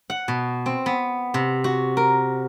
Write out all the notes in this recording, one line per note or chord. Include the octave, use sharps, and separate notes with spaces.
F#5
B2
C4
B3
C3
F#4
A#4